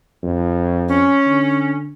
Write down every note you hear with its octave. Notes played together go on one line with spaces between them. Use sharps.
F2
C#4
D3